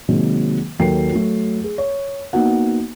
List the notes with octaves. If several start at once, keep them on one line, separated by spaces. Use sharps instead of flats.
C3 D#3 F#3 G#3 A#3
D#2 F#3 A#3 A4 G5 C7
F#3 A3
G#4
C#5
A#3 B3 D#4 F#4 F#5